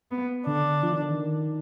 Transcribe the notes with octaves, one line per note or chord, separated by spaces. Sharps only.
B3
D3 D4
F3
D#3
D3
D#3